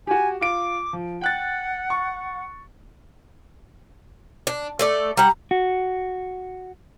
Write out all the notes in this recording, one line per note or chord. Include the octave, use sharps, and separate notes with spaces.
F#4 G4 G#5
F4 D6 D7
F3
F#5 G5 F#6 A6
C#6
D4
A3 A4 D5
G3 F#5 A#5
F#4